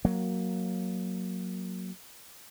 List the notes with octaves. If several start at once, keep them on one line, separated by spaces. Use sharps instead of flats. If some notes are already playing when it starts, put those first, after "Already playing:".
F#3 A#3